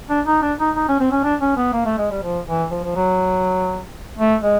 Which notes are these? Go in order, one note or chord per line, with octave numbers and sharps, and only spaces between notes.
D4
D#4
D4
D#4
D#4
C#4
C4
C#4
D4
C#4
B3
A#3
A3
G#3
G3
F3
E3
F3
F3
F#3
A3
G#3